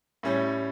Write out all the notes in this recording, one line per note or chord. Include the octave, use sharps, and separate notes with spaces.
A2 G3 C#4